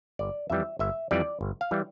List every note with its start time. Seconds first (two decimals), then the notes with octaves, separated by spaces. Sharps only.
0.19 G1 D5
0.50 F2 E3 G3 E5
0.79 G1 E5
1.11 F2 E3 G3 D5
1.41 G1
1.61 F5
1.71 E3 G3